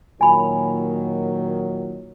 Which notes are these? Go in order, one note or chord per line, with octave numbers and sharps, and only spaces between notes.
A#2 D#3 F#3 G#5 B5